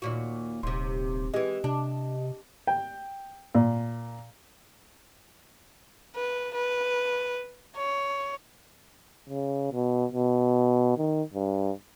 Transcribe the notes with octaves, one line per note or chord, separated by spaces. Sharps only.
D#2 A#2 F#4
D#1 D#2 C3 C6
E3 G#3 G4 D#5
C3 D4
G5
A#2
B4
B4
C#5
C#3
B2
B2
D#3
G2